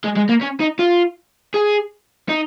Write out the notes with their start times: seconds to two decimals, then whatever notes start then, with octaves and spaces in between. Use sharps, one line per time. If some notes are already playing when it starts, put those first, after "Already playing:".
0.04 G#3
0.16 G#3
0.29 A#3
0.41 C#4
0.60 D#4
0.79 F4
1.54 G#4
2.29 D#4